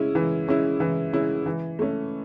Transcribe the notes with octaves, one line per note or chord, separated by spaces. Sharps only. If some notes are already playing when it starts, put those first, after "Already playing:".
Already playing: G#3 C#4 E4
E3
G#3 C#4 E4
E3
G#3 C#4 E4
E3
A3 C#4